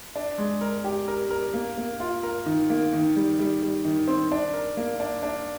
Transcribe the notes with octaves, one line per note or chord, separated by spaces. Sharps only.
D4
G#3
A#4
G4
A#4
A#4
A#3
A#3
F4
A#4
D#3
A#3
D#3
G3
G3
G3
D#3
C4
D4
A#4
A#3
D4
D4